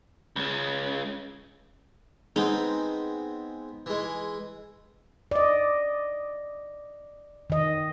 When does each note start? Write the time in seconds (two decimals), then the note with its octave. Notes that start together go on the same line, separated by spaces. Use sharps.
0.36 C#2 C#3
2.36 G#3 B3 C4 D#4
3.86 E3 G#3
5.31 D5 D#5
7.50 D#3 D#5